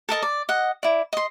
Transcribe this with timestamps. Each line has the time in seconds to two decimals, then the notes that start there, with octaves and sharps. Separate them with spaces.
0.09 A4 A#4 D#5 A5
0.22 D5
0.49 D#5 F#5
0.83 E4 D5
1.13 D#5 C6